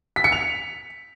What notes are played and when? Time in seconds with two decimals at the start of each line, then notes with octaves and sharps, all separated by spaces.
0.16 B6
0.24 C#7
0.32 F7